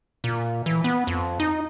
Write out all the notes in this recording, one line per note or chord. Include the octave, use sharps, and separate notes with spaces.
A#2
E3
B3
F2
D#4